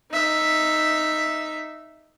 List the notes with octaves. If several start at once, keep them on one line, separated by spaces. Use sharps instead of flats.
D#4 E5